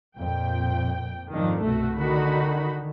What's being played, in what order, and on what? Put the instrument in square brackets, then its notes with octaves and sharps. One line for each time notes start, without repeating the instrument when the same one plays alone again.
[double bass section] F2 A#2 [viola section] G5
[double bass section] F2 G#2 F3 [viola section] D#3 D4
[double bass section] C2 G2 B2 [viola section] A3 F#4
[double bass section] D3 D#3 [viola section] D#4 F#4 B5